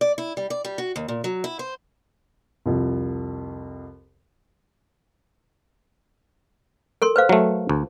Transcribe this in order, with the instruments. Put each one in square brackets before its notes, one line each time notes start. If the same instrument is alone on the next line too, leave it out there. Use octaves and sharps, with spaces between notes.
[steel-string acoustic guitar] D5
E4
G3
D5
G3
F#4
D#2
A#2
F#3
E4
C5
[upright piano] C2 F2
[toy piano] A4 A#4 C6
B4 C5 F5
[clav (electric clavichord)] F#3 A3
D2